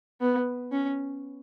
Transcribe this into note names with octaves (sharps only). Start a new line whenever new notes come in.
B3
C#4